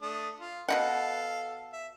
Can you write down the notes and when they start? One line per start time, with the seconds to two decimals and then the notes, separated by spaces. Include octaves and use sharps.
0.02 A3 D4 D#6
0.40 F4
0.68 B2 D#4 A4 F5 F#5
1.73 E5